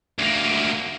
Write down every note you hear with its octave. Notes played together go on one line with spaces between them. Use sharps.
D2 A#3